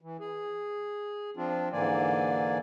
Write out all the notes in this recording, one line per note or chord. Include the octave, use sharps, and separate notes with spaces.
E3
G#4
F3 C4 D4 F4
G#2 D3 E3 A#3 D5 G#5